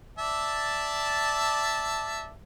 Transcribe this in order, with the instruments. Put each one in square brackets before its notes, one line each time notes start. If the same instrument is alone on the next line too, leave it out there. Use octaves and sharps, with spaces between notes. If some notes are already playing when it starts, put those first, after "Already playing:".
[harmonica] D5 E5 A5